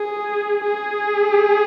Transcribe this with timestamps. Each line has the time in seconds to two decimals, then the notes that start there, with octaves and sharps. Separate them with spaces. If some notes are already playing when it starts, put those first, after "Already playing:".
Already playing: G#4
0.64 G#4